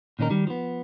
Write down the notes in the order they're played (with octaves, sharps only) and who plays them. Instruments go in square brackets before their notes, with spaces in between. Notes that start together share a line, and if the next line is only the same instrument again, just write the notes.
[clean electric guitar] A#2 D#3 C#4 D#4 A#4
D#3 G3
F3 B3